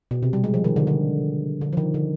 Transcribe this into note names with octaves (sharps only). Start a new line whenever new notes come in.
B2
C3
G3
G#3
F3
D#3
D3
D3
D3
F3
D#3
D3